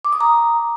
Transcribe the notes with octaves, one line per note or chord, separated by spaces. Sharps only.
D6
D#6
A#5